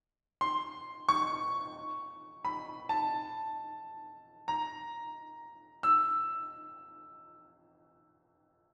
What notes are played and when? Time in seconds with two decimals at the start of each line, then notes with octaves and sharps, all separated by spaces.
0.41 C6
1.09 C#6
2.45 B5
2.89 A5
4.48 A#5
5.83 E6